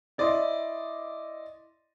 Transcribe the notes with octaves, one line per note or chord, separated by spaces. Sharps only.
E4 D5 D#5 C6